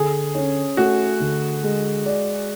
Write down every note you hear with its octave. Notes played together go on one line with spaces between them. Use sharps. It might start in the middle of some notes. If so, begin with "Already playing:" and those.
Already playing: D3 G#4
C#4
A3 F#4
D3
G#3
D5